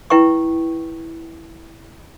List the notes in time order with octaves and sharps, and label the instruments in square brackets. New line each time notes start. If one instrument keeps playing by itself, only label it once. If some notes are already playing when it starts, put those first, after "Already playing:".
[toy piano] E4 B4 G5 C#6